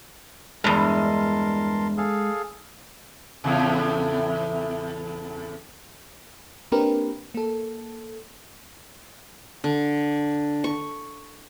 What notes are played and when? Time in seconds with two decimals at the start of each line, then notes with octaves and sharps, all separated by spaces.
0.64 E2 G2 G#3 A#4 A5 C6
1.97 G#4 A4 F5
3.44 E2 A2 C#3
6.72 A#3 C4 D4 G4 A#4 B4
7.34 A#3 A4
9.64 D3
10.64 C#6